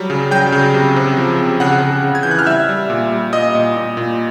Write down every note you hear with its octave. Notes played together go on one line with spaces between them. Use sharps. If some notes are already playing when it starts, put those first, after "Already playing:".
Already playing: F#3 G3
C#3
F#3 G5 G6
C#3
C3
C3
F3
C3
C#3 F#5 F#6
C#3
C#3
G#6
E3 G6
F#6
F6
G3 E5 E6
G3
A#2
G3
A#2 D#5 D#6
A#2
A#2
A#2